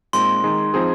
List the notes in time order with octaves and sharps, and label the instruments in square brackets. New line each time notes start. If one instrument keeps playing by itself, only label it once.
[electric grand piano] A#2 G#3 C4 D#4 [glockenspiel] C6
[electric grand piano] D#3 G#3 D#4 G#4
F3 C4 D#4 G#4